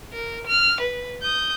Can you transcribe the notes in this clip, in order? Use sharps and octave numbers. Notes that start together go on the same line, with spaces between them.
A#4
F6
B4
D#6 G6